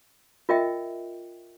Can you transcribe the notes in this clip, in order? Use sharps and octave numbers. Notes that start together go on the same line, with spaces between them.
F4 A#4 D#5 E5 G5